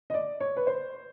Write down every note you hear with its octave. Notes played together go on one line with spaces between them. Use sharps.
D#5
D5
C#5
B4
C5